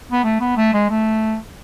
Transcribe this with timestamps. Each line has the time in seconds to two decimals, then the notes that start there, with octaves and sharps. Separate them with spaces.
0.12 B3
0.24 A3
0.40 B3
0.57 A3
0.73 G#3
0.90 A3